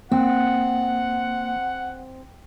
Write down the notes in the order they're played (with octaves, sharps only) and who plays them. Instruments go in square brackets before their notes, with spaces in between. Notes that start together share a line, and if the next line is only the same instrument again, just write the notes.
[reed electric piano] A#3 [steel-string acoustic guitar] C4 [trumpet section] F#5